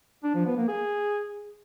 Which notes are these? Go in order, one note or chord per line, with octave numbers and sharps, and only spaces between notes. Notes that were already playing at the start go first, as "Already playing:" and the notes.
D4
F3
B3
A#3
G#4